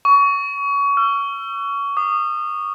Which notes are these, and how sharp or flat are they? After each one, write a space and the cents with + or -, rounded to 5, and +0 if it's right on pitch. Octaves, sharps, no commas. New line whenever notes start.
C#6 +25
E6 +40
D#6 -30